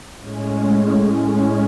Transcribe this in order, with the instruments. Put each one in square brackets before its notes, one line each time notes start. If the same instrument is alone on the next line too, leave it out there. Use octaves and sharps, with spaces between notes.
[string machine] A2 G#3 C#4